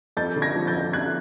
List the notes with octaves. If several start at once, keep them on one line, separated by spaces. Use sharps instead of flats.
F2 G6 A6
D3
G#6 A#6
F3
G6 A6
F2
F2 F#6 G#6